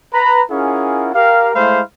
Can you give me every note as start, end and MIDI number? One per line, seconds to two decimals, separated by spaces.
0.14 0.42 71
0.14 0.42 82
0.14 0.42 83
0.51 1.09 61
0.51 1.09 64
0.51 1.09 65
0.51 1.09 68
0.51 1.09 70
0.51 1.09 78
1.14 1.50 67
1.14 1.50 70
1.14 1.50 77
1.55 1.80 56
1.55 1.80 57
1.55 1.80 64
1.55 1.80 72
1.55 1.80 77
1.55 1.80 83